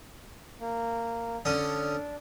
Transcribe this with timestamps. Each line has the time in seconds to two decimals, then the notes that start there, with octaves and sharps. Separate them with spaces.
0.60 A#3
1.45 D3 C#4 D4 D#6